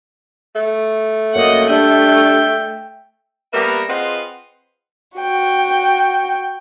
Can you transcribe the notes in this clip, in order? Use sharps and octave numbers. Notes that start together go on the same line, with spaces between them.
A3
F#2 A#3 D#5 F#5
G3 D4 E5 G5
G3 A#3 B3 A#4 B4 E5
C4 F4 G#4 B4 D#5 F#5
F#4 G5